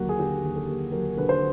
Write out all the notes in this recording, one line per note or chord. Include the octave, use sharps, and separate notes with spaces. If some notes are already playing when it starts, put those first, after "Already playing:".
Already playing: D#2 D3 F#3 A#3 F#4
G#4
D3 G4
D#2
A4
A#3
F#3 A#4
D3 B4
C5